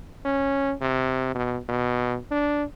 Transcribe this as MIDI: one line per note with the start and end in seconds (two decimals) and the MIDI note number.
0.25 0.74 61
0.81 1.34 48
1.35 1.59 47
1.69 2.17 47
2.31 2.63 62